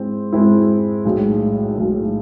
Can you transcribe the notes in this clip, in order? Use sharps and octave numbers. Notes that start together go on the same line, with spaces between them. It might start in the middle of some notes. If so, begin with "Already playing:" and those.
Already playing: G#2 G#3 C4 E4
G#2 G#3 C4 E4
B1 A2 G#3
B1 A2 G#3